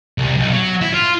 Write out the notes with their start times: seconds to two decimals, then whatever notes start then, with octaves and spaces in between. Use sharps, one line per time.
0.18 C2
0.37 B1
0.53 F#3
0.81 E4
0.94 F4